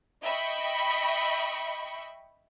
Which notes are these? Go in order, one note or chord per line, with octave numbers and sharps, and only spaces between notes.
D#5 E5 G5 B5 C#6